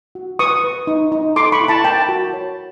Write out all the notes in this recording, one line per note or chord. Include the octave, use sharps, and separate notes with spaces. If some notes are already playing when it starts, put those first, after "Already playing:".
F#4
B4 C#6 D#6
B4
D#4
D#4
A4 C6 D6
B5 C#6
E4
A5 B5
A#4 G5 A5
F#4
C#5